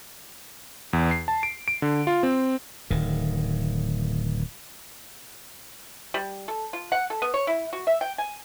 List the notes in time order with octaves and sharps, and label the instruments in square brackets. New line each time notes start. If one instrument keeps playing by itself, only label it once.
[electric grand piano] E2
C7
A5
D7
D7
D3
F4
C4
[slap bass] D1 D#3
[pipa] G3
A4
F4
F#5
A4
B3
C#5
E4
F#4
E5
G5
G#5